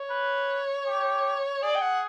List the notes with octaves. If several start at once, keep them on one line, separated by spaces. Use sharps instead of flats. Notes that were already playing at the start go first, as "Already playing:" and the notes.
Already playing: C#5
B4
G4
G#4 D5
G5
F#5